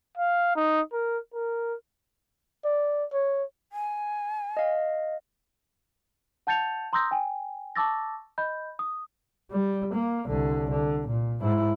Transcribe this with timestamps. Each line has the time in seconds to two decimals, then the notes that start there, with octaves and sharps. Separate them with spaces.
0.17 F5
0.56 D#4
0.92 A#4
1.34 A#4
2.65 D5
3.12 C#5
3.72 G#5
4.57 D#5 F5
6.47 F#5 A5 G6 A6 C#7 F7
6.93 A#5 C6 D#6 E6 G6 A#6
7.11 G5 G#5
7.76 A5 C#6 D6 E6 A6 A#6
8.38 D#5 B5 G6
8.79 D#6
9.51 G3
9.94 A#3
10.27 C2 D3
10.71 D3
11.08 A#2
11.40 G#2 E4